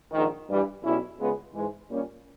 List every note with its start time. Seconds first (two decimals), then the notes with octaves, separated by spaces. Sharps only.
0.12 A#1 G#2 D#3
0.48 G2 E3 G3
0.83 B1 B2 G3 C#4 E4
1.18 C#2 C#3 G#3 B3
1.53 G#2 E3 G#3
1.89 A#2 G3 C#4